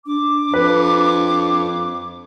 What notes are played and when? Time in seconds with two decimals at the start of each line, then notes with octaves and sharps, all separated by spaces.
0.06 D4 D6
0.54 F2 B4